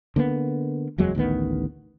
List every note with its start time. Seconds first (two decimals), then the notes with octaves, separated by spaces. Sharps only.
0.16 D3 A#3 B3
0.98 F#1 E2 F#3 G#3
1.15 A1 D2 D#3 B3